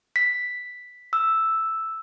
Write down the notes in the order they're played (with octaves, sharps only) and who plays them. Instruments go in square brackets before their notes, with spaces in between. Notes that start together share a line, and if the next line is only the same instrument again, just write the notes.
[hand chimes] B6
E6